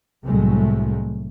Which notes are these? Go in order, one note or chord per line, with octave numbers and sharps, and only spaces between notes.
C2 A2 F#3 G#3 A3